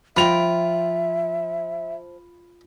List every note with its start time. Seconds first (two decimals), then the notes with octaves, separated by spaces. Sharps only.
0.17 F3 F4 D#5 E5 G5 B5 F7